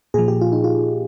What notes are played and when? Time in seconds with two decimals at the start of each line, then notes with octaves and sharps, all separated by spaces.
0.14 A#2 F3 G#4
0.28 G4
0.41 F4
0.52 D#4
0.64 F4